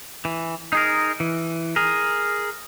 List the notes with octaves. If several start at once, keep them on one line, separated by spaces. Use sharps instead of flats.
E3
D#4 G#4 A#4
E3
G#4 A#4